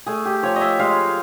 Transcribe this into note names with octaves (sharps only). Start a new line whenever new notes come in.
A3 G#4
G4
F3 C#5
D#5
E5
G#3 F5